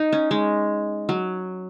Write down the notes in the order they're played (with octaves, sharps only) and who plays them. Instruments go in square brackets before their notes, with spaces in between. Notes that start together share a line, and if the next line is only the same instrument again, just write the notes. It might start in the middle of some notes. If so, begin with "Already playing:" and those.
Already playing: [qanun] D#4
C#4
G#3
F#3